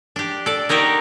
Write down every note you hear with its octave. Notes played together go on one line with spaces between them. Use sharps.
D4 G4
A4 D5
A#3 D#4 F#4 G4 A#4